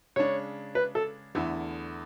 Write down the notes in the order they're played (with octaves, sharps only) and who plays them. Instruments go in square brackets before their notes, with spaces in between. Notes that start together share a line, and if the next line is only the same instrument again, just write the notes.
[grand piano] C#3 G#3 D4 [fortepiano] C#5
[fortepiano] B4
A4
[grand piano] E2 D3 A3 E4